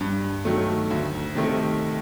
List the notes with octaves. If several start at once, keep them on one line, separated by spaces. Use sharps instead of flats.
G2
D#3 F#3 A3
D2
C3 D#3 A3